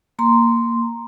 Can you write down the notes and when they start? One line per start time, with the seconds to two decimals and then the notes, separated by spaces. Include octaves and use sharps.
0.19 A#3 A#5 C6